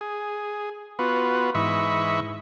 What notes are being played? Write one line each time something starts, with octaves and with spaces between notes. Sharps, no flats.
G#4
B3 F4 F#4 B4
G#2 E3 D#5 E5 B5 C#6